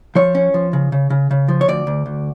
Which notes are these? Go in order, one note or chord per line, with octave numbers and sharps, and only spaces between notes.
F3 C#5
C#4
F3
C#3
C#3
C#3
C#3
F3
C#5
D2 D5
D2
D2